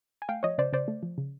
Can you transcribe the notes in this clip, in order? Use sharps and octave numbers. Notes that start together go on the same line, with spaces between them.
G#5
A3 F5 G5
F3 C#5 D#5
C#3 C5 D5
C#3 C5 D5
A3
F3
C#3